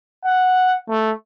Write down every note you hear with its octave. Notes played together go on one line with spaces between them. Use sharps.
F#5
A3